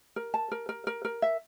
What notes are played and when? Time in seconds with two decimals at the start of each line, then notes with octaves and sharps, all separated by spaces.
0.16 A#4
0.34 A5
0.52 A#4
0.69 A#4
0.87 A#4
1.05 A#4
1.22 E5